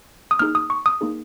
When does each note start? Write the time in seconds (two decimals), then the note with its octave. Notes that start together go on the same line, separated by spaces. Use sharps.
0.31 D#6
0.39 A#3 D#4 G#4 F6
0.55 D#6
0.70 C#6
0.86 D#6
1.01 A#3 D#4 G#4